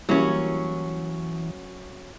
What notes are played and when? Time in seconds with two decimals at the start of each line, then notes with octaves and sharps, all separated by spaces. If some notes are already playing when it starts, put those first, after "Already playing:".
0.09 E3 F#3 G3 A#3 C#4 E4